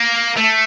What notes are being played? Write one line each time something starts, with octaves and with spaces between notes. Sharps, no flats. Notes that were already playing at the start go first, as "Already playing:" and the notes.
Already playing: A#3
A3